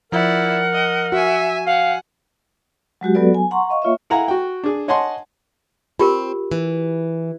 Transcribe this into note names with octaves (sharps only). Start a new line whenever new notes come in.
F3 E4 A#4 D5 F#5
D#5
F#4 E5 G#5
F5 F#5 G#5
F#3 G#3 F#4 G4
F#3 B3 F#4 A4 B4 D5
G#5
F#5 A#5 C6 C#6
D#5 F5 C#6
A#3 F4 C#5 E5
E4 F5 F#5 G#5 A#5
F#4 G5
D4 G#4
C#5 D#5 F#5 G#5 A5 C6
C4 F4 G4 A#4
E3